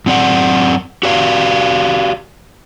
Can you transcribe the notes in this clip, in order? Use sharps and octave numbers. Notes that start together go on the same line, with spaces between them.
F#2 C4 D5 F#5
F#4 G4 D5 F5